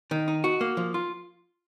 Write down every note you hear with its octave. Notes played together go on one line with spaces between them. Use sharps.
D#3
D#4
F#4
A#3
F3
F4